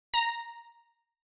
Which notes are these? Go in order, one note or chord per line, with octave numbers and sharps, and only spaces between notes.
A#5